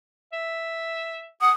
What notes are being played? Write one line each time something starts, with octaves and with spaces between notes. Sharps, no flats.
E5
F#5 D#6